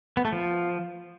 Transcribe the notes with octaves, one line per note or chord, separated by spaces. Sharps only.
B3
A3
F3